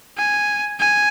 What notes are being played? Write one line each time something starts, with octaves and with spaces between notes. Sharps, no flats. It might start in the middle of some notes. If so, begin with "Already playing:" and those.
G#5
G#5